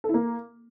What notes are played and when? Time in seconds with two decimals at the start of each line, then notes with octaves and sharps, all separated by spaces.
0.04 A4
0.09 E4
0.14 A#3